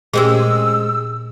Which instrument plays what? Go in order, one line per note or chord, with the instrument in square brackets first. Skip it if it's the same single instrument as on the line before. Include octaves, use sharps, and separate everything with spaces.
[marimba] A#2 G4 D6 [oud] G#3 C4 C#4 [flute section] E6